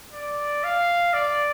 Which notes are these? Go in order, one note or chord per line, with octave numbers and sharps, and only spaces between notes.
D5
F5
D5